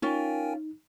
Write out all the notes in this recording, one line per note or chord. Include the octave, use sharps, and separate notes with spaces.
C#4 D#4 F4 A#4 G5 G#5